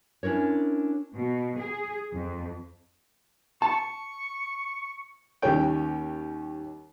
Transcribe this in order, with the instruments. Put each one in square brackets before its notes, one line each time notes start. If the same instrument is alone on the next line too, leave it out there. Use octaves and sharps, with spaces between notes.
[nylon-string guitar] C#4 D4 E4 A#4 C#5
[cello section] B2
G#4
F2
[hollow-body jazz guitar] A5 [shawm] C#6
[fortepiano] D#2 G3 C#4 G5